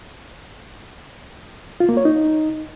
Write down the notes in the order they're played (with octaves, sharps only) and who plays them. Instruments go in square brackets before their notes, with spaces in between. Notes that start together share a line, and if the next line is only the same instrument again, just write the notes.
[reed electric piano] F4
A#3
C#5
D#4